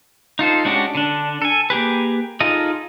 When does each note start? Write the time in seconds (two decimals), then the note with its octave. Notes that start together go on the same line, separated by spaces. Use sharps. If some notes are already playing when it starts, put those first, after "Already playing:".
0.39 D#4 F4 A4 C5
0.65 G#3 C#4 D4 F#4 G4
0.95 D3 D4
1.42 A4 G#5
1.70 A#3 G4 G#4 B4
2.40 D#4 F4 G#4 A4 D#5